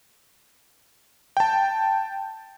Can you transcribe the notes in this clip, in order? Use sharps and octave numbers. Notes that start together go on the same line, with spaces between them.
G5 A5